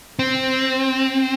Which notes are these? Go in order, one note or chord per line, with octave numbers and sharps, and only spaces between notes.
C4